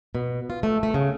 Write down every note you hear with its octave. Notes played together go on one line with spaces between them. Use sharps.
B2
F4
A3
A3
C#3